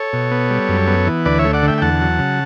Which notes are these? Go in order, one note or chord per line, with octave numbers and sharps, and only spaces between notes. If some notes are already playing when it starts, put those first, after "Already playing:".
Already playing: A4 C#5
B2
B3
G3
F#2
B3
E3
D2 B4 D5
C#5 E5
A3
D5 F#5
D3
E5 G5
G5
E2 F#5 A5
F#3
C#3